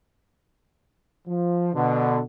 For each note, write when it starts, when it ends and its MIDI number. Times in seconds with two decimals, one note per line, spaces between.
1.27 1.72 53
1.74 2.21 47
1.74 2.21 50